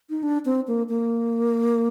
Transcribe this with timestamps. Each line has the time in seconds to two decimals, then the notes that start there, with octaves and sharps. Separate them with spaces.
0.10 D#4
0.23 D4
0.45 C4
0.68 A#3
0.89 A#3